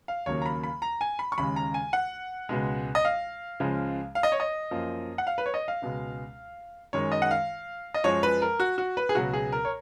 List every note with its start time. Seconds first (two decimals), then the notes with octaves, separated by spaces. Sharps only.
0.08 F5
0.26 D#2 C#3 F#3 A#3 C#5
0.42 A#5
0.46 B5
0.64 B5
0.82 A#5
1.01 G#5
1.19 B5
1.32 C#6
1.38 D#2 C#3 G#3 B5
1.56 A#5
1.74 G#5
1.93 F#5
2.49 C#2 B2 G#3
2.95 D#5
3.05 F5
3.60 C#2 C#3 F3 G#3
4.15 F5
4.23 D#5
4.32 C#5
4.40 D#5
4.71 F#2 F3 A#3
5.18 F#5
5.27 F5
5.38 B4
5.46 C#5
5.54 D#5
5.68 F5
5.82 C#2 B2 G#3
6.93 F#2 D#3 G#3 C#5
7.12 D#5
7.22 F#5
7.31 F5
7.94 D#5
8.04 F#2 F3 G#3 C#5
8.23 B4
8.42 A#4
8.60 F#4
8.78 F#4
8.97 B4
9.09 G#4
9.15 C#2 B2 F#3 F#4
9.33 G#4
9.52 A#4
9.65 C#5